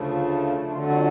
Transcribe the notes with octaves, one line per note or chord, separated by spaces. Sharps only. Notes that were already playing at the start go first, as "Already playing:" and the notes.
Already playing: D2 C#3 F3 A3
D4
F2 D3 F#3 A3 F4
F#4